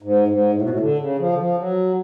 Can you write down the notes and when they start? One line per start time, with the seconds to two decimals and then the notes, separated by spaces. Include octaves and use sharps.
0.02 G#2
0.28 G#2
0.54 A2
0.62 B2
0.70 A2
0.80 D3
0.99 C#3
1.18 F3
1.33 D3
1.38 F3
1.57 F#3